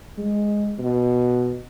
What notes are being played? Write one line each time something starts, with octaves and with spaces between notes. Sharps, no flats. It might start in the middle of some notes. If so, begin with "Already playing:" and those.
G#3
B2